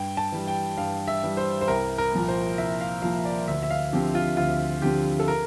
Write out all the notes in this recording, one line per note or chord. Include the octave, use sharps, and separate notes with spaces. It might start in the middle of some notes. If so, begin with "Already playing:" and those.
Already playing: G2 G5
A5
E3 G3
G5
G2 F5
E5
E3 G3
C5
C5
C2 A#4
A#4
A#2 F3 A#3
C5
C2 E5
F5
A#2 F3 A#3 F5
D5
D2 E5
E5
F5
D3 F3 C4 G4
F4
D2 F4
D3 F3 C4 G4
A4
A#4